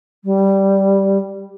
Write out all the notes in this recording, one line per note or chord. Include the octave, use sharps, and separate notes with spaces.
G3